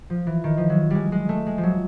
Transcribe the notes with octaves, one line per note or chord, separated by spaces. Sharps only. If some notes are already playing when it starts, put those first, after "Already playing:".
F3
E3
D#3
F3
F#3
G3 G#3
G#3
A3
G#3
F3
F#3